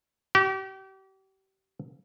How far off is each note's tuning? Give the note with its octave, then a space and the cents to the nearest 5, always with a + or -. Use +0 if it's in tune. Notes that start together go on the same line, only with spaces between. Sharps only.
G4 -35